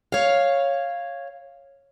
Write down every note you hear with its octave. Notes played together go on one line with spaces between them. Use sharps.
C#5 F5